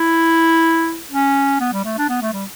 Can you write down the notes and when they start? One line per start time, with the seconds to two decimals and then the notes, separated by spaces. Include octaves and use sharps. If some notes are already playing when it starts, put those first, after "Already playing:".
Already playing: E4
1.11 C#4
1.60 B3
1.73 G3
1.85 A3
1.98 D4
2.09 B3
2.21 A3
2.34 G3